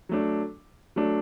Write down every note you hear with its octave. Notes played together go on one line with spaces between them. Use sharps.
F#3 A3 D4
F#3 A3 D4